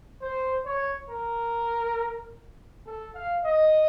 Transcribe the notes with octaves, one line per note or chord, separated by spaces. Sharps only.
C5
C#5
A#4
A4
F5
D#5